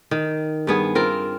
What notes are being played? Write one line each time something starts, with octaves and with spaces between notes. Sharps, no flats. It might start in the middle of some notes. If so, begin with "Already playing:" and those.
D#3
G2 B3 G#4
C4 F4 A#4